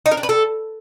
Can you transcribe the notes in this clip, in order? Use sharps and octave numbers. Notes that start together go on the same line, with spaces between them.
D#4
A#4
D4
B4
A4